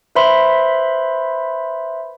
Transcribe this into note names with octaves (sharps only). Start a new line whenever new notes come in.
B4 C5 E5 B5 C6